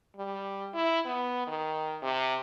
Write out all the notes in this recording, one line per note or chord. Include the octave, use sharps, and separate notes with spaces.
G3
E4
B3
D#3
C3